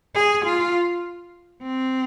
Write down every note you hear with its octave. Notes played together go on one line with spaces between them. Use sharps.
G#4
F4
C4